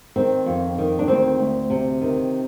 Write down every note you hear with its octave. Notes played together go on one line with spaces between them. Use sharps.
D#3 C4
F2
D#3
D4
D2 C4
D2
C3
D#3